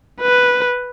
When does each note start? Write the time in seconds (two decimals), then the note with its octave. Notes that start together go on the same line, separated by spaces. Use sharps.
0.21 B4